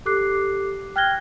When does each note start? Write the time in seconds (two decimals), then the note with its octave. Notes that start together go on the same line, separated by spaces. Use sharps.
0.05 G4 A4 D6 F#6 C7
0.96 G5 F6 F#6 G#6 A#6 G7